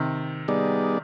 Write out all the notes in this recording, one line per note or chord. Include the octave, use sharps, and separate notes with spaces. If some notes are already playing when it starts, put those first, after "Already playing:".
Already playing: C3 D#3
G3 B3 D#4 G#4 D5